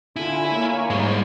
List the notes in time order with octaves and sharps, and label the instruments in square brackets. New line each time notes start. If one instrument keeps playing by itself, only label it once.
[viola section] D3 F4 [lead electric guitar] E4 [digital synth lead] G#5
[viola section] A#3 C#5
[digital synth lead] G#2 [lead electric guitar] G3 G#3